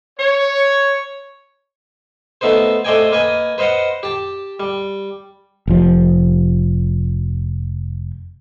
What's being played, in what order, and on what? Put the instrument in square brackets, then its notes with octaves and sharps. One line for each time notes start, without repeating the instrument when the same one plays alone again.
[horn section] C#5
[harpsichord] A3 B3 D#4 B4 C5
A3 C5 D5 D#5 G5 G#5
A#3 B4 D#5 G#5
B4 C5 D#5 F5 F#5
G4 A5
G3
[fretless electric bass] F1 F3